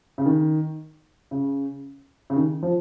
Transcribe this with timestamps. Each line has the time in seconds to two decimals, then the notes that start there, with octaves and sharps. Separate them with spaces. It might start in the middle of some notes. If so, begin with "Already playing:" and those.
0.18 C#3
0.26 D#3
1.31 C#3
2.30 C#3
2.36 D#3
2.63 F3